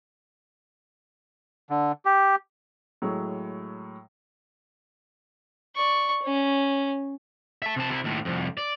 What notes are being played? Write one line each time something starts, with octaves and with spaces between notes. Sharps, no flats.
D3
G4
A2 F#3 G#3
D5 C#6
C#4
E5 A5
C3 A5
C3 E4
D#2 A2
C2 F2
D5